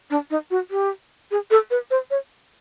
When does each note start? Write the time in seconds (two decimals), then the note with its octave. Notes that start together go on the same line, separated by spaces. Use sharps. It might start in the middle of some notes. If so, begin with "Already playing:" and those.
0.10 D4
0.30 D#4
0.51 F#4
0.71 G4
1.31 G#4
1.51 A4
1.71 B4
1.91 C5
2.11 C#5